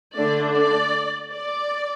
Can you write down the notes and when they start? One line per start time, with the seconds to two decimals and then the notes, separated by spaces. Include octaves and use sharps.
0.15 D3 A3 D4 D5
0.54 D5
1.31 D5